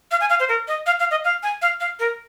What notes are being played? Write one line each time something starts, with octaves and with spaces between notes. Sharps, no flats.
F5
G#5
F5
C5
A#4
D#5
F5
F5
D#5
F5
G#5
F5
F5
A#4